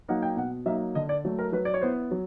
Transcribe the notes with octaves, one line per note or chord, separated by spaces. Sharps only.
F#3 A#3 D#4 F#5
G5
B2 F#5
F#3 A#3 D#4 E5
D3 D#5
D5
F#3 A3
A#4
F#3 B4
D5
C#5
B3 E4 C5
F#3